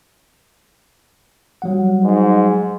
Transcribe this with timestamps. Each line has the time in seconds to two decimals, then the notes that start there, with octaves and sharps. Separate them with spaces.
1.62 F#3 G3 F#5
2.04 G#2